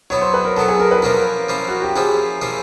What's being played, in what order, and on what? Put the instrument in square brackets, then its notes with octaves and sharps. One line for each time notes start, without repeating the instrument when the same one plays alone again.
[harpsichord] F#3 B3 E4 [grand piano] C#5
[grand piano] C5
B4
A#4
[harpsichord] F#3 B3 E4 [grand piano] A4
[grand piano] G#4
A#4
B4
[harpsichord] F3 A#3 C#4 E4 [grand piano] A#4
[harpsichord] F3 A#3 C#4 E4
[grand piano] F#4
G4
[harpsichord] F3 A#3 C#4 E4 [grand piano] G#4
[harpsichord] F3 A#3 C#4 E4